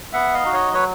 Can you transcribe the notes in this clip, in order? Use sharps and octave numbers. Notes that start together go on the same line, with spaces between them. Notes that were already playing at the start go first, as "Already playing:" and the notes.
B3 E5 F#5
D#5 F5
D#4 F#4
C#5 D#5
F#3 B4 C#5